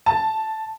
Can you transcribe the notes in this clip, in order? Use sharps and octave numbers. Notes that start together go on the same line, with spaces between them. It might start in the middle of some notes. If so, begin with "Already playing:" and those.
A5